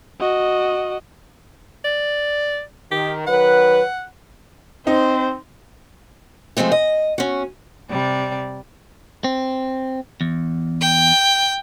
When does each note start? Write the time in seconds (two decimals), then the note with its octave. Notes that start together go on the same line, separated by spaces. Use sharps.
0.21 F#4 D#5
1.85 D5
2.92 D#3 G4
3.27 D#3 F#3 B4 F#5
4.87 C4 D#4 C5
6.57 F3 G#3 A3 C4 D#4
6.72 D#5
7.18 C#4 F#4
7.89 C3 G3 D5
9.24 C4
10.21 E2
10.81 G5